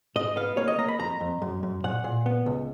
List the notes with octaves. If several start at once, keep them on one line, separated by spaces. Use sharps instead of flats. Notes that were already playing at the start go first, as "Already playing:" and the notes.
G#2 D#5
B3 F5
A#3 C#5
D#5
A#3 A#5
B5
F2 A#5
F2
F#2
F#2
A#2 F#5
A#2
B3
C#2